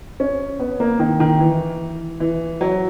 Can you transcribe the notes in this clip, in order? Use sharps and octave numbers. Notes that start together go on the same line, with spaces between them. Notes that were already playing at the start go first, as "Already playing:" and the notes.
C#4
B3
A#3
D#3
D#3
E3
E3
F#3